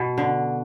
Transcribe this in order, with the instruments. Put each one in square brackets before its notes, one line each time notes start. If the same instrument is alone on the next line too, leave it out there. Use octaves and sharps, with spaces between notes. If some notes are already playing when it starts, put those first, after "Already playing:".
Already playing: [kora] B2
D3